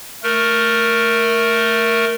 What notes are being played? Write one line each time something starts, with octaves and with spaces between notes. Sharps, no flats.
A3 A#4